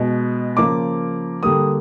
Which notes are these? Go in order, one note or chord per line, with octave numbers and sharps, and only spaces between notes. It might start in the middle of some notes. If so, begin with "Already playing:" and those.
Already playing: B2 G#3
C#3 F3 A#3 D6
D3 G3 A#3 D#6